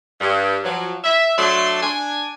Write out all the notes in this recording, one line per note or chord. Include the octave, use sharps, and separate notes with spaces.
G2
F3 F#3
E5
F#3 A3 D4 C6
D4 G#5